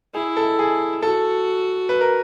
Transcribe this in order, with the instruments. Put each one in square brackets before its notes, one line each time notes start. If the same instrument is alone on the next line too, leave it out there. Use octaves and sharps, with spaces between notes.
[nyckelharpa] E4 [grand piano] G#4
[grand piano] A4
G#4
[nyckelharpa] F#4 [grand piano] A4
[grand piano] B4
A#4